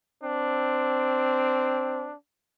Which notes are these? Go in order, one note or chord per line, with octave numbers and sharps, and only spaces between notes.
C4 D4